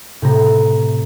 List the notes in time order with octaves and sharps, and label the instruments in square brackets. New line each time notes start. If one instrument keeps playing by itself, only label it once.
[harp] A2 C3 A#5